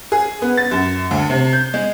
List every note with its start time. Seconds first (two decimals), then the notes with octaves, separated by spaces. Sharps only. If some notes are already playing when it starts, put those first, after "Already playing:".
0.12 G#4
0.42 B3
0.57 A6
0.71 F#2
1.11 D2
1.30 C3
1.53 G6
1.74 G#3